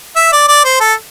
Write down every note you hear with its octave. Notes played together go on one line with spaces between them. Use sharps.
E5
D5
D5
C5
A4